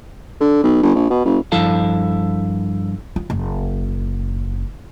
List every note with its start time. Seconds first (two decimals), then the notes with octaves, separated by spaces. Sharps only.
0.40 D3
0.64 B1
0.82 G1
0.95 A#1
1.10 B2
1.25 F#1
1.52 G2 F3 E4 A4 F5 A5
3.16 F4
3.30 F#1